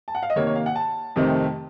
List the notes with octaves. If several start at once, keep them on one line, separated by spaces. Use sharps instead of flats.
A5
F#5
F5
D#5
C3 D#3 A#3 C#5
C#5
F5
F#5
A5
F2 C3 D#3 A3 C4